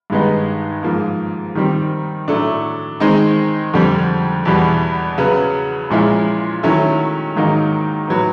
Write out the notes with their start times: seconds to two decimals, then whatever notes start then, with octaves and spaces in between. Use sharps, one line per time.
0.10 G2 D#3 G#3 B3 D#4
0.83 G#2 F3 A#3
1.55 D#3 G3 C4
2.28 A2 F#3 A3 D4
3.00 D#3 G#3 C4 D#4
3.74 F2 D3 G3 C4
4.45 E2 B2 G3
5.18 C#3 F#3 B3
5.90 A#2 F3 G#3 C#4 E4
6.63 D#3 F#3 A3 C#4 E4
7.36 G#2 D#3 F#3 A#3 D#4
8.08 A2 F#3 B3